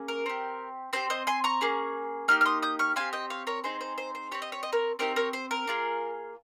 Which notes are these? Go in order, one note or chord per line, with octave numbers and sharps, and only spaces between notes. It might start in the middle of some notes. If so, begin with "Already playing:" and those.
Already playing: A#3 C#4 G#4
A#4
C4 G4
C4 G4 C5
C5 D#5
G#5 C6
A#5 C#6
A#3 C#4 G#4
A#3 D#4 G4 F6
F6
C6 D#6
D#6 G6
C#6 F6
C4 D#4 G4 F5 G#5
D#5 G5
C#5 F5
A#4 C#5
C4 D#4 G#4 C5
C5
C5
C5
C4 G4 C#5
D#5
C#5
D#5
A#4 C#5
C4 D#4 G4 A#4 C#5
A#4 C#5
C5
A#4
A#3 F4 G#4